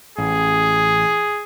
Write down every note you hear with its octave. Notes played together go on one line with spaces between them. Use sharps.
A1 G#4